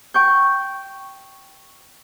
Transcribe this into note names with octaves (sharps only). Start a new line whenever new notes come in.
G5 C#6 G6